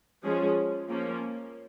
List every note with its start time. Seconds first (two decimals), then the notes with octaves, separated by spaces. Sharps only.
0.24 F3 G#3 C#4 G#4
0.89 F3 A#3 C#4